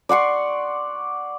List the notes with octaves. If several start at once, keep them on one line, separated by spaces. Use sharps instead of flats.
D5 F#5 C6 C#6